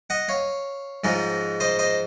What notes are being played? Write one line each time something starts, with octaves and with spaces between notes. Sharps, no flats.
D#5 F#5
C#5 F5
G#2 F3 G#3 D#4
C5 D#5
C5 D#5